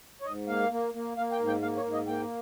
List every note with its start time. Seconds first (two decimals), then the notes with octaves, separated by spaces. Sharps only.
0.22 C#5
0.25 G#2 D#5
0.48 A#3 F5
0.71 A#3
0.94 A#3
1.17 A#3 F5
1.32 G5
1.39 G#2
1.47 G5
1.62 A#3 F5
1.77 C#5
1.85 G#2
1.93 D#5
2.07 A#3 G5